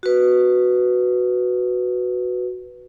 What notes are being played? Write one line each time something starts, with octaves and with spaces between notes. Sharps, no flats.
F#4 B4